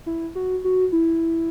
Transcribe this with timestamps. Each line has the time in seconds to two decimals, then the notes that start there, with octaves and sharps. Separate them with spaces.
0.06 E4
0.35 F#4
0.64 F#4
0.92 E4